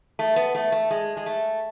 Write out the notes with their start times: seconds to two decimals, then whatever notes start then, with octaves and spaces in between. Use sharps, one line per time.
0.19 A3
0.36 B3
0.55 A3
0.72 A3
0.90 G#3
1.17 G#3
1.26 A3